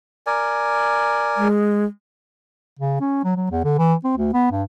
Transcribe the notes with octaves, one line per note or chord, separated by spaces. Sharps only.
A#4 D5 G#5
G#3
C#3
C#4
F#3
F#3
E2
D3
E3
C4
D2
B3
G2